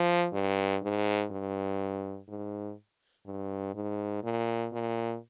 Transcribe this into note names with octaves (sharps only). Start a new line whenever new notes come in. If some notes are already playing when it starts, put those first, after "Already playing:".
Already playing: F3
G2
G#2
G2
G#2
G2
G#2
A#2
A#2